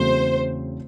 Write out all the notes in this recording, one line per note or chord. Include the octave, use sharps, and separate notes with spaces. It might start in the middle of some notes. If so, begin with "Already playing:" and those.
Already playing: E2 C#3 F#3 A3 C4 C5